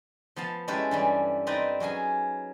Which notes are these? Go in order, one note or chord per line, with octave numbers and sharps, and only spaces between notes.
F3 B3 F5 A5
G#3 C#4 E4 G4 A4 B4
G2 E3 G3
C4 D#4 B4 D5 A#5
F#3 C#4 G#4 G#5